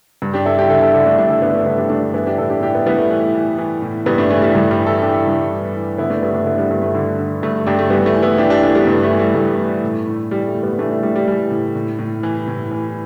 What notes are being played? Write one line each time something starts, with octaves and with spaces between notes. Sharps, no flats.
G2
D4 G4
G2 E4 A4
D4 G4
D3 E4 A4
E4 A4
D3 D4 G4
A3 D4
G2 D4 G4
E4 A4
D3 G3 B3
A3 D4
D3 B3 E4
D4 G4
G2 A3 D4
E3 B3 E4
D4 G4
A2 E4 A4
D4 G4
A2 D4 G4
B3 E4
A2 G3 B3
A3
E3
E3
E3
A2
G2 G3 B3
A3 D4
E3 A3
G3
G2 G3
G3
E3
E4 A4
E3 D4 G4
G2
G2
E3
D3 B3 E4
A3 D4
G2 G3 B3
A3 D4
D3 B3 E4
G3 B3
G2 A3
A3
D3
D3
G2 A3
G2 D4 G4
A3
E3 G3 B3
A3
E3
B3 E4
E3 D4 G4
D4 G4
E3 A3 D4
G3 B3
G2 A3
A3
E3
G3
G2 A3
E3
A2
A2
E3 G3
A3
A2
G3 B3
E3 A3 D4
A3
A2 G3
G3
E3 G3
A2
A2
A2
E3
A2
E3